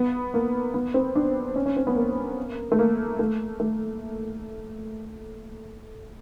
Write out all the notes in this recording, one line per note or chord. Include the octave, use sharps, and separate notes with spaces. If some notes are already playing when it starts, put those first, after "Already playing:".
Already playing: B3
A#3
B3
C4
D4
C#4
C#4
C4
B3
A#3
A3
A#3
A3
A3